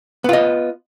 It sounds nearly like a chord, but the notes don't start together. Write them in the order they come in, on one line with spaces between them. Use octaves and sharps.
B3 F4 D#5